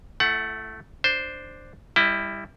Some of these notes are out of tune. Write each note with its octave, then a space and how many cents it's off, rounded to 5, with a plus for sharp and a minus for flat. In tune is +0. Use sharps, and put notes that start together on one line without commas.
A3 -5 E4 +30 F#5 +10
D4 +5 C5 +0
G3 +20 E4 +0 D#5 -30